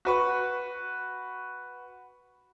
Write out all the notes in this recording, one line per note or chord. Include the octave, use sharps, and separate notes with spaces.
F#4 B4 C#6